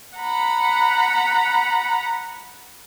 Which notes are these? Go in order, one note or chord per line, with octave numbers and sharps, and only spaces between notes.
F#5 A#5 B5